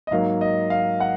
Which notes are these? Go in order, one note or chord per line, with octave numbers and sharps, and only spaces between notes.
D#5
G#2 F#3 A#3 F5
D#5
F5
F#5